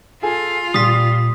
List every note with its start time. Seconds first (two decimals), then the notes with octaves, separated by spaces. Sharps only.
0.23 F4 G#4 A4 G#5
0.74 A#2 G3 C6 D#6 B6